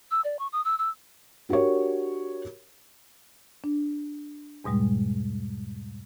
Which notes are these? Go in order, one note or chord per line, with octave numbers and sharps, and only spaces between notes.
E6
D5
C#6
D#6
E6
E6
D4 F#4 G4 A#4 C#5
D4
E2 G#2 B2 G3 G#3